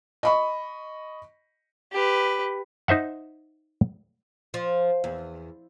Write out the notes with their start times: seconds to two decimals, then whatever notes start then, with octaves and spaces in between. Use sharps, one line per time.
0.23 D#5 B5 C#6
1.93 G4 B4
2.88 D#4 C5 E5 F#5
4.54 F3
5.04 E2